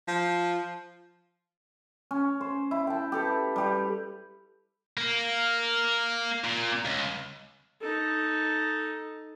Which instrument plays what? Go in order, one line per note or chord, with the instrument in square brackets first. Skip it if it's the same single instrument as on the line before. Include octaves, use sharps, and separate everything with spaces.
[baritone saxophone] F3
[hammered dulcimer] C#4
C5
E4
G5 A5
G4 A4 B4
G3 G4 B4
[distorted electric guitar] A#3
A#2
C#2
[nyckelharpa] D#4 A4